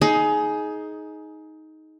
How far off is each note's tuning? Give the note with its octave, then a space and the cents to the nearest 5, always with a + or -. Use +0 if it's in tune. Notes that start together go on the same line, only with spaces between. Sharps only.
D#4 +10 G#4 +20